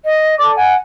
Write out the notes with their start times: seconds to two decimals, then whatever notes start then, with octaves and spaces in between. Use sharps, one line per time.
0.03 D#5
0.38 A4 D5 D6
0.55 F#5 G#5